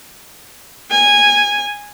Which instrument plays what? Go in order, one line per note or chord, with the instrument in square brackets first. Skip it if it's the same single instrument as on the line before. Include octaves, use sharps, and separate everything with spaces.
[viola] G#5